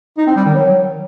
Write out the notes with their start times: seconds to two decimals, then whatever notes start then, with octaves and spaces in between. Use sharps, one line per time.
0.17 D#4
0.27 C4
0.36 G3
0.45 D#3
0.54 F#3